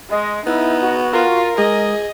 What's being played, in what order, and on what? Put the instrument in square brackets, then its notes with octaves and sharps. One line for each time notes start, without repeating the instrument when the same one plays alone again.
[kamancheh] G#3 [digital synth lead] D#5
[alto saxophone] B3 [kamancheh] D#4 [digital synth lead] E4
[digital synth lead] F#4
[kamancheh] F4 [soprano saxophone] A#4
[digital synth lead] G#3 [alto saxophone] G#4 [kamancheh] D#5